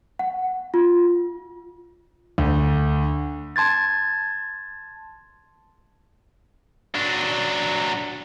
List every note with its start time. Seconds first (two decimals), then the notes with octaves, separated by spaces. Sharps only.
0.19 F#5
0.74 F4
2.38 D2
3.56 A5 C6 G#6 A6
6.95 F#3 D4